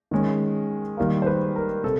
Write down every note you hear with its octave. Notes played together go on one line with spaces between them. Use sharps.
D#3 G#3 C#4
D#3 G3 A#3
C5
B4
A#4
C3 A4